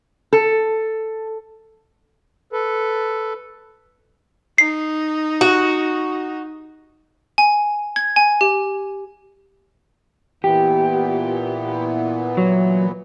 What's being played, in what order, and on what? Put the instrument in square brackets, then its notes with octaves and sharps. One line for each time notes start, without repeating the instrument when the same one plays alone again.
[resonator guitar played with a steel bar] A4
[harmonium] A4 B4
[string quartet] D#4 [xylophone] C7
[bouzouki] F#4
[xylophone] G#5
G#6
G#5
G4
[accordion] A#2 E3 B3 [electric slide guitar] G4
[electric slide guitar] F#3